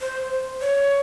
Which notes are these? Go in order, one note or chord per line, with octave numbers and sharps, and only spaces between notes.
C5
C#5